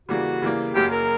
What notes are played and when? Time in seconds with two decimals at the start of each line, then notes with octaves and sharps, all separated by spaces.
0.08 C#3 E3 G3 A#3 F#4
0.42 C#3 E3 G3 A#3
0.75 F#1 F#2 C#3 F#3 A#3 G4
0.91 A#4